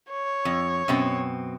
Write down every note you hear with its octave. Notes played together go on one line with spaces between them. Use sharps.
C#5
F2
F#2 B2 C4